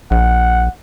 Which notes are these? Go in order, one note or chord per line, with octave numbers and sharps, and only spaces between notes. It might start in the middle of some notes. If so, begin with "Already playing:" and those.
A#1 F#5